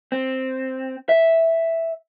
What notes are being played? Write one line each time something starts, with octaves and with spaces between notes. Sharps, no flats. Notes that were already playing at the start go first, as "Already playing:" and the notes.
C4
E5